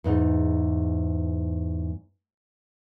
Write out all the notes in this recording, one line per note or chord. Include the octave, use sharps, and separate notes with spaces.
E2 G#2 D#4